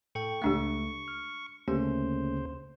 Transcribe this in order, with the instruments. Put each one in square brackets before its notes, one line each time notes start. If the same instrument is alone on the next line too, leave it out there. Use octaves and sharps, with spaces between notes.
[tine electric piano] A2 A4 G5 [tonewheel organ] C#6
[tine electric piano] C#2 A3 [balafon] G#3 D4 G4
[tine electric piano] F6
[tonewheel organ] D2 C#3 C5 [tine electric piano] A3 A#3 C#4 [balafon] G4